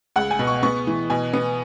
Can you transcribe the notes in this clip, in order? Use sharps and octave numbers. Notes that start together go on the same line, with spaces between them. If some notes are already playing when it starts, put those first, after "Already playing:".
C#2 F#5
G#5
B2
C#6
B3 C#6
E3
B2 G#5
B3